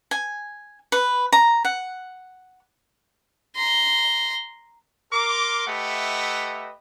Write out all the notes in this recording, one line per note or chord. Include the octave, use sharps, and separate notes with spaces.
G#5
B4
A#5
F#5
A#5 C6
A#4 C6 D6
A3 G4 B4 D#5 E5 F#5